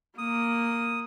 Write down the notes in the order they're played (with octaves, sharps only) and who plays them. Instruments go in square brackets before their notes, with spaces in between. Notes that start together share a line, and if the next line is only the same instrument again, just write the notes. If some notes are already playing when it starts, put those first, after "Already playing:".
[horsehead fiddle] A#3 [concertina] D#6